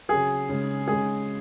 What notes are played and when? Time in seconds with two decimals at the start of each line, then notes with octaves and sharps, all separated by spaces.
0.09 C#3 F#3 G#4
0.49 C#3 G#3
0.87 C#3 G#3 G#4